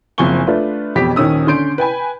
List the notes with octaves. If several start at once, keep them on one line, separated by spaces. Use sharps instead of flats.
F#1 F3 C4 G#5 C#6 G7
A3 D4 F4 B4
E1 F2 B2 G4 B6
D#1 D#3 C#4 D#6 E6
D3 C#4 C6 G6 D7
B4 G5 G#5 B5